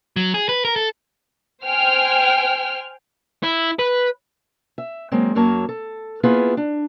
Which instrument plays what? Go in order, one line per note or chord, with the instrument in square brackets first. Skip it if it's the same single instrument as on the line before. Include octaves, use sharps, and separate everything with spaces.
[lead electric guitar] F#3
G#4
B4
A#4
A4
[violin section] C5 G5 G#5 F6
[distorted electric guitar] E4
B4
[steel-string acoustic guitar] E5
F#3 G#3 A#3 C4
F#2 F#3 A#3 C#5 A5
A4
A#3 B3 E4 F4 G#4 B4
D4